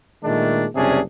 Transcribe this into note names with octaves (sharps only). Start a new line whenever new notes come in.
A#2 D#3 G#3 A3 D4
F#1 C3 G3 C#4 D4 G#4